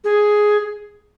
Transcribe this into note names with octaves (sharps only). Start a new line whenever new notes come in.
G#4